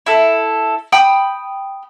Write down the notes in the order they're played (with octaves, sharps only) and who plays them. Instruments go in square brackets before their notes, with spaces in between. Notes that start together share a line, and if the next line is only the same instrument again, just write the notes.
[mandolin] E4 A4
G5 B5 D#6